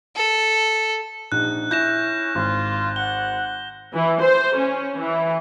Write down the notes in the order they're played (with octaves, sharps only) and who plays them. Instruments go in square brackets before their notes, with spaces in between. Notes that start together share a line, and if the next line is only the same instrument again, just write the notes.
[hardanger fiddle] A4
[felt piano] A#1 D#4 [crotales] F#6
[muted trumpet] C#4 [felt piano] E4 [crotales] G6 A#6 E7
[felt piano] G#1 [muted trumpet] F4
[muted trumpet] F#5 [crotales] G7
[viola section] E3
C5
C#4
E3